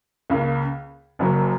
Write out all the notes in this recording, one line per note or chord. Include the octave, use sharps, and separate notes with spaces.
C#2 C#3 A#3
F#1 F#2 F#3 A#3